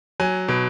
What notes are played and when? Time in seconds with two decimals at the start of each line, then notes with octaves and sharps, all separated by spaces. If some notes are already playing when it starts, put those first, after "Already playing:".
0.20 F#3 G#5
0.48 B2